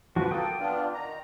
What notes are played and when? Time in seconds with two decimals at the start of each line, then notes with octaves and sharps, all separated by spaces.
0.16 F3 B3 F#4 B4
0.31 A#3 A4 G5 D#6
0.60 B3 D4 F4
0.94 D#3 A#5